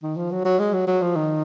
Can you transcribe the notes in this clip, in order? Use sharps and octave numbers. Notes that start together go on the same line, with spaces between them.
D#3
F3
F#3
F#3
G#3
F#3
F#3
F3
D#3